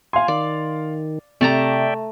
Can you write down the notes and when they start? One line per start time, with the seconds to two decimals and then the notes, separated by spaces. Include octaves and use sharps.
0.13 F5 G#5 C6
0.28 D#3 D5
1.41 C3 A3 D5 E5 G5 A5 A#5